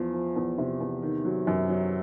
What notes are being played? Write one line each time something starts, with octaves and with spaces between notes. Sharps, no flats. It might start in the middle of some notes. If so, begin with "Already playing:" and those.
Already playing: E2 F3
F3
E2
C3
E2
D#3
F#3
F#2
F#3